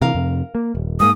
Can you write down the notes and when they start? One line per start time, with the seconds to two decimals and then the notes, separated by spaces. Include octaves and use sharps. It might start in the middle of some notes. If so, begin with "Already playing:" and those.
0.02 C3 E3 A#4 F5
0.14 F2 C3
0.55 A#3
0.75 D#1
1.00 G#2 A#3 D#6